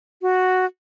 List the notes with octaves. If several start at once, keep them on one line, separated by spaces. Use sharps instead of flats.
F#4